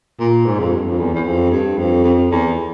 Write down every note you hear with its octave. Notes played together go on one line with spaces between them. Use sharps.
A#2
G#2
F2
G2
F2
E2
E2
F2
G2
F2
F2
E2